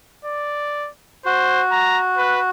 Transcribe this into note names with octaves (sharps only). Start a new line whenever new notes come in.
D5
F#4 C5
A#5
B4